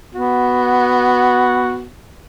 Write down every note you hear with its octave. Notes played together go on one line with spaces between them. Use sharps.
B3 F#4